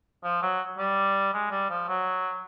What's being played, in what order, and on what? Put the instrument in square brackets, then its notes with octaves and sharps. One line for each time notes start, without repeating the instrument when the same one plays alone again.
[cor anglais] F3
F#3
G3
G#3
G3
F3
F#3